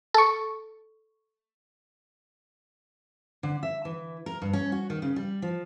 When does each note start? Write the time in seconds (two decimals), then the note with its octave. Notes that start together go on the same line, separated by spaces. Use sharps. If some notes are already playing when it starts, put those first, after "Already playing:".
0.14 A4 C#6
3.43 D3
3.63 E5
3.85 E3
4.26 A#4
4.42 G2
4.53 C#4
4.72 F#4
4.90 D#3
5.02 C#3
5.16 G3
5.42 F3